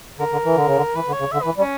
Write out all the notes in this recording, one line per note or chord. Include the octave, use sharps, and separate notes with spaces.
D3 A#4
D3
E3
D3
C#3
D3
E3 B4
D3
C#5
C#3
D3 E5
E3 B4
G3
C#4